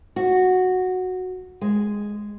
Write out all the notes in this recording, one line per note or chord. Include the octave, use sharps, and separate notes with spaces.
F#4
G#3